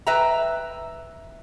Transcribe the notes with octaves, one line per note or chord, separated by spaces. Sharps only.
B4 D#5 E5 G5 A#5